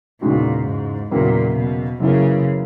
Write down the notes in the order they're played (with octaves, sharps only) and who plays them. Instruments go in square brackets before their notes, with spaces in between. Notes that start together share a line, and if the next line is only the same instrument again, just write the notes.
[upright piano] E2 C#3 G#3 D#4 F#4 [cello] A#2
[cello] G#2
[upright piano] E2 C#3 F#3 A#3 E4 [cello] A#2
[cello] B2
[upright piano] F#2 E3 A#3 [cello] C#3